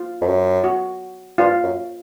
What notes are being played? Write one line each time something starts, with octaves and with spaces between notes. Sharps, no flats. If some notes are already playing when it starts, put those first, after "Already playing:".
Already playing: F4
F2
F#2
F#4
G2 F4
F#2